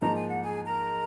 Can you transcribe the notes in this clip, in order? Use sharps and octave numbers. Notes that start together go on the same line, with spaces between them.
G#2 F3 A#3 D#4 A#5
G#5
F#5
G#4 G#5
A#4 A#5